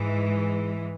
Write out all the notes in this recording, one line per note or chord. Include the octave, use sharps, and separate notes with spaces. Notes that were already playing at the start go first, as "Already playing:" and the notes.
Already playing: G#2 E3 G#3